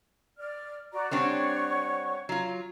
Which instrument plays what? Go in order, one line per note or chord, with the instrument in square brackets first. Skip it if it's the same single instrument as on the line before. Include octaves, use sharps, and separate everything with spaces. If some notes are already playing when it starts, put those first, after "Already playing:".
[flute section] D5 F6
F#4 D5 A#5
[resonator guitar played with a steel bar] G3 C4 D4 [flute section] C#5 F#5 C#6
[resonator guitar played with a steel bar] F#3 F4